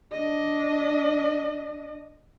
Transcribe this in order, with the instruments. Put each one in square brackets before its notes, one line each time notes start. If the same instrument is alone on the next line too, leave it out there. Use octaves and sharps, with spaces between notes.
[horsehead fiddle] D4 D#5